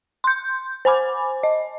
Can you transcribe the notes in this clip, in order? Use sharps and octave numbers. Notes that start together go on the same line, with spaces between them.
C6 G6
C5 G#5 B5 D6
D#5